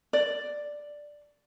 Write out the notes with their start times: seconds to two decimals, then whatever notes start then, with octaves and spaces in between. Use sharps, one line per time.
0.13 D5